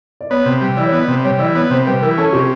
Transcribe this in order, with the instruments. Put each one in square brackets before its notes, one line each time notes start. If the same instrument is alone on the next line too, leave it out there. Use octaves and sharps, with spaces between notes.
[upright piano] D5
[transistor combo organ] B3 [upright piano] C#5
[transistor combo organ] C3
G3
[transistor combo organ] E3 [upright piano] D5
[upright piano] C#5
[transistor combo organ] B3 [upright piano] D5
[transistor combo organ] C3
[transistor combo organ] G3 [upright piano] C#5
[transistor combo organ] E3 [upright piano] D5
[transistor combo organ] B3 [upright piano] C#5
[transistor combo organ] C3 [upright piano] C5
[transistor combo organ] G3 [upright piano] B4
[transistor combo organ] E3 [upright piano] A#4
[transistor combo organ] C#4 [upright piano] A4
[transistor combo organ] C3 [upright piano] G4